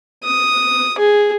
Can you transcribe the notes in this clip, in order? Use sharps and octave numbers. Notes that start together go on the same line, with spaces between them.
D#6
G#4